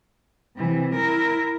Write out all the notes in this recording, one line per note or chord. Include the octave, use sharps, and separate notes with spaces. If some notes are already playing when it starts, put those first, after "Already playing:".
C3 E3
E4 A#4